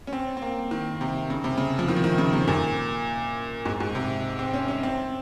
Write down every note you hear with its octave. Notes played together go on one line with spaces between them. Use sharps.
C#4
C4
C4
A#3
D#3
C3
C#3
C3
C#3
F3
D#3
F3
D#3
C#3
C3
A#2
G#2
G#2
C3
C4
C#4
C#4
C4